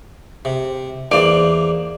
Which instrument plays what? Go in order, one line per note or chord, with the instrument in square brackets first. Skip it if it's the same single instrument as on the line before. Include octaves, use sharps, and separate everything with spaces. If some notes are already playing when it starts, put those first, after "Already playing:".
[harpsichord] C3
[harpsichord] E2 A#3 C5 [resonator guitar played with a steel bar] D5